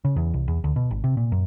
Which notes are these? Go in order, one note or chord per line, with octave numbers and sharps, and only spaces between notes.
C#3
E2
C2
E2
D2
B2
G#1
C3
A#2
F#2